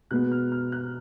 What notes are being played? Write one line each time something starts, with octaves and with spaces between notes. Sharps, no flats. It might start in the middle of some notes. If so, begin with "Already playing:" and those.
B2 G#3 B3 F#6
F6
F6
F#6